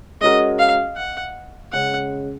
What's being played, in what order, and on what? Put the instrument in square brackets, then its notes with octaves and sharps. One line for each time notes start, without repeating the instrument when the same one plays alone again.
[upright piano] G#3 C#4 F#4 A#4 [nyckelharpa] D#5
[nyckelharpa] F5
F#5
[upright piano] C#3 G#3 C#4 [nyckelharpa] F#5